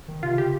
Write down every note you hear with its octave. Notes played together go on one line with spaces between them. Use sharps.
D#3
C3 F4
C#3 G4